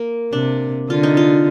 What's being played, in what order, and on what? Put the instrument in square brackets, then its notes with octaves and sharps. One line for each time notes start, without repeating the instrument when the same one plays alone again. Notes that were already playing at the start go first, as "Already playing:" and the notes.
Already playing: [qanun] A#3
[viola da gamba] C3 [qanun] D4
[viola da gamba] D3 [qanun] F4
[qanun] D#4
F4